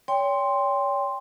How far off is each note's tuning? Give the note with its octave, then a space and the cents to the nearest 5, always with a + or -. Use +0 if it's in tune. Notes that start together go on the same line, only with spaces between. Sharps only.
C#5 +35 G5 +20 C6 +0